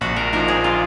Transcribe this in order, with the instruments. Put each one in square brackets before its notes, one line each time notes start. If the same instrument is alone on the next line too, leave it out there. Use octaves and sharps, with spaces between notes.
[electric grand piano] A#1 [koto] F#4
[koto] A#4
[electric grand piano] A#2 F3 A#3 D#4 [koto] A#4
[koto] G#4
F4